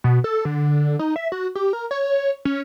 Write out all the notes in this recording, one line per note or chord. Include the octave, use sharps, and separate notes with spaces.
B2
A4
D3
D#4
E5
F#4
G4
A#4
C#5
C#4